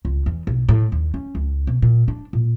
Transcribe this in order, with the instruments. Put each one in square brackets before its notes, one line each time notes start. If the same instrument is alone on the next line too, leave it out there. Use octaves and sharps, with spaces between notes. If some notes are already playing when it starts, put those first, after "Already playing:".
[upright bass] C#2
E2
B1
A2
D#2
C#4
C#2
B2
A#2
D4
A#2